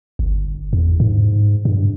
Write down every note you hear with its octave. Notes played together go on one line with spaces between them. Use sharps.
G1
E2
G#2
G2